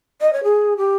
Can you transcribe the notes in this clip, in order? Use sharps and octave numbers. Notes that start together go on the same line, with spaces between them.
D#5
C#5
G#4
G4